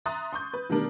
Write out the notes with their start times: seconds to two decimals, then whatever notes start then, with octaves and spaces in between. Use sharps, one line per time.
0.06 E5 A#5 C6 D#6 F#6 A6
0.33 C6 C#6 G6
0.53 B4
0.69 B2 D#3 G3 A3 D4 A#4